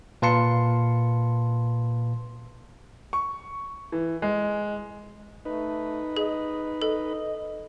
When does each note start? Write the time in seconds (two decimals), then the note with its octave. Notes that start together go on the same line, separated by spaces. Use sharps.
0.22 A#2 B4 F5 A5 C6 C#7
3.13 C#6
3.92 E3
4.22 G#3
5.45 A3 D#4 B4
6.17 G#4 D#5
6.82 A4 D#5